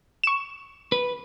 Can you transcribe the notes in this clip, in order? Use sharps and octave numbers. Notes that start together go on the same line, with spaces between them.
C#6 E7
B4